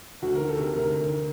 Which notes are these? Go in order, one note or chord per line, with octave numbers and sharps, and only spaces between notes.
D2 F#4
D#3 A#4
A4
C3 A#4
D2 A#4
D2
D#3